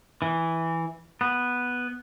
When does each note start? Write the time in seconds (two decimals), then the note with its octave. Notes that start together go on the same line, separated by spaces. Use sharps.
0.22 E3
1.21 B3